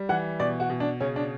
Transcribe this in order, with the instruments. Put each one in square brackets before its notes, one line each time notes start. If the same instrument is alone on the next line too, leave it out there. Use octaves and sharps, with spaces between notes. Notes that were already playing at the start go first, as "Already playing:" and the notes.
Already playing: [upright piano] G3
E3 F#5
B2 D5
F#4
B2
D4
C#3 C#4
D4